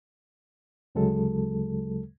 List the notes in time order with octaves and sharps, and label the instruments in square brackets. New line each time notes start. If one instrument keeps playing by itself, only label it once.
[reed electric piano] D2 C#3 F#3 G#3 A4